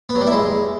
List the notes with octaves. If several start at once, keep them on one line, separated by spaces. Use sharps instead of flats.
B3
F#3
G3
E4
G#3